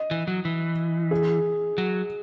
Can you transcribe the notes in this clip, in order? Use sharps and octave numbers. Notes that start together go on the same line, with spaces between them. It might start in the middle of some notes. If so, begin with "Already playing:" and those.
Already playing: D#5
E3
F#3
E3
G#4
F#3